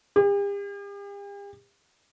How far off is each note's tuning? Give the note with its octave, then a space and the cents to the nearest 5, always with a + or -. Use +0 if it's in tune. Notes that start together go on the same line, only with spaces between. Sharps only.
G4 +45